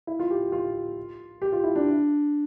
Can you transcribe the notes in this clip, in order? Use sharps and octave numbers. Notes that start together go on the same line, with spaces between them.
E4
F4
G4
F4
G4
F4
E4
D4